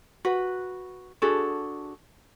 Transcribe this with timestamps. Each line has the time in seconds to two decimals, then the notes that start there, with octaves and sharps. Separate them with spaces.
0.25 F#4 B4
1.22 D4 F#4 G#4 A4